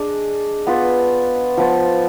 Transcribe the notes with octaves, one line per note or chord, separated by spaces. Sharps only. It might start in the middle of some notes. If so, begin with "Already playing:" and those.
Already playing: D4 G#4 D#5
B3 F4 B4
F3 B3 F4